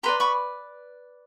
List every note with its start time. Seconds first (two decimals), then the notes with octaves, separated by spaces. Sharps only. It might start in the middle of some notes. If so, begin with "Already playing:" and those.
0.03 G4 B4 D5 A#5 C6
0.20 B5 C#6